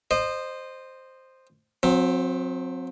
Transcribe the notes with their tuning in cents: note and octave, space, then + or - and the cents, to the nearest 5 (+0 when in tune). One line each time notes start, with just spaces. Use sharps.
C5 +0 D#5 -25
F#3 -40 C4 +0